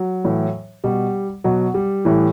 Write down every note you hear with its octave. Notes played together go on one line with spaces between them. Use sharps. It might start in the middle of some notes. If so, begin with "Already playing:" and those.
Already playing: F#3
A2 E3
B2 G3
B2 F#3
G3
A2 E3